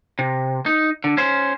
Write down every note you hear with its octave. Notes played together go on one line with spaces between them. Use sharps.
C3
D#4
D3
C#4 C5